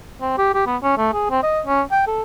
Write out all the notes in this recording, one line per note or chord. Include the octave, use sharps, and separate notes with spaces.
C4
G4
G4
B3
C#4
A3
G#4
C4
D#5
C#4
G5
A4